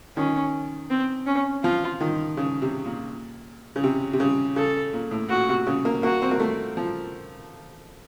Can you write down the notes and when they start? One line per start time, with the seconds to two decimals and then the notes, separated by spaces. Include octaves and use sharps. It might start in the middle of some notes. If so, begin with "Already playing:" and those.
0.17 D#3 C#4
0.90 C4
1.26 C#4
1.63 F3 F4
2.01 D#3
2.37 C#3
2.62 C3
2.85 A#2
3.76 C#3
3.84 C3
4.13 C3
4.20 C#3
4.56 C#3 A4
4.93 A#2
5.11 A2
5.29 A#2 F#4
5.49 C3
5.66 C#3
5.85 A#3
6.03 A#3 F#4
6.22 C4
6.31 A#3
6.40 A3
6.77 F3